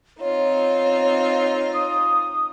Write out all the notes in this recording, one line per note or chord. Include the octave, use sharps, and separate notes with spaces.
C4 D#4 F4 C#5
D#6